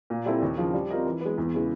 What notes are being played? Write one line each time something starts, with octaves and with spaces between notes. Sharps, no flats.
A#2
G3 C4 E4 A4
D#2
C#3 F3
G3
C4 F4 A#4 D#5
E3
G#3 B3
E2
C#3 E3 G#3